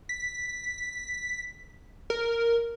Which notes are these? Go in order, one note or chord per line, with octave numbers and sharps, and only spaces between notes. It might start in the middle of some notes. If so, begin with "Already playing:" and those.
B6
A#4